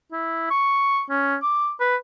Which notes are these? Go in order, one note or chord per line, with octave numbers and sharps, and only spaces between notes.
E4
C#6
C#4
D6
B4